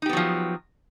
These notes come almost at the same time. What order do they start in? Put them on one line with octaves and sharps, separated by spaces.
D#4 G4 B3 F#3 F3